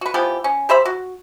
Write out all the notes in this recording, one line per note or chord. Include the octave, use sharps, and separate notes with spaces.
F#4 B4
E3 F3 B3 G4
C#4
G4 C5 E5 B5
F#4